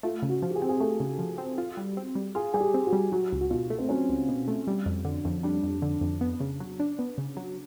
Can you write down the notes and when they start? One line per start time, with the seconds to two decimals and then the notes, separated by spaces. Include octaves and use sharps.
0.03 A3 F4
0.22 C#3
0.29 F#4
0.42 F3
0.50 G4
0.56 G#4
0.62 C4
0.69 G#4
0.80 A3 A4
1.00 C#3
1.19 F3
1.38 C4
1.58 F4
1.77 G3
1.97 C4
2.15 G3
2.35 F4 G#4
2.54 G3 G#4
2.60 G4
2.74 C4
2.87 F#4
2.93 G3
3.12 F#3 F#4
3.32 C#2
3.41 F#4
3.50 B2 F4
3.70 A3
3.79 C4
3.89 F#3 C#4
4.09 C#2
4.29 B2
4.48 A3
4.67 G3
4.86 F2
5.05 D3
5.25 F2
5.43 G3 D4
5.63 F2
5.82 D3
6.01 F2
6.21 B3
6.40 C#3
6.60 F#3
6.80 D4
6.99 B3
7.18 C#3
7.37 F#3